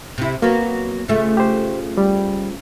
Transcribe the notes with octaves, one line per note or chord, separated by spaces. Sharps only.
C3 E4
F#3 A#3 B3
C#3 F3 A3
G4 C5
G3